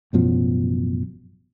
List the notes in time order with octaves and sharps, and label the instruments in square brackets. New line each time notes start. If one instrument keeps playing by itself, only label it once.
[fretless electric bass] A1 F#2 B2 F3